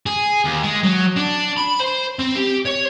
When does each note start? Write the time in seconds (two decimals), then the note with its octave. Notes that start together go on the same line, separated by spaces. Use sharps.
0.06 G#4
0.45 D#2
0.63 G#3
0.83 F#3
1.16 D4
1.57 B5
1.80 C5
2.19 C4
2.36 G4
2.66 C#5